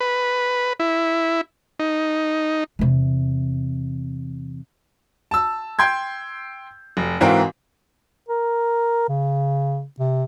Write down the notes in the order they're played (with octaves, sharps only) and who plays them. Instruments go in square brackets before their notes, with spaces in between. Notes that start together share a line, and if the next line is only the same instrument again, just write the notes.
[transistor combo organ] B4
E4
D#4
[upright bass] E2 C3
[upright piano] A5 E6
G5 C6 G6 G#6
F1
G#2 E3 C4 F#4 A#4 F5
[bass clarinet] A#4
C#3
C3